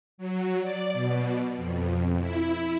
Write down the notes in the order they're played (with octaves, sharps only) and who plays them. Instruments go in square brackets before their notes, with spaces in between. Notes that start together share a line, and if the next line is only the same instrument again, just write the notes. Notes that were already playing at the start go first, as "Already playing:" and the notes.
[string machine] F#3
D5
B2
F2
E4